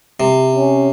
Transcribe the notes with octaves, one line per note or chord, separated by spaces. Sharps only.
C3
C#4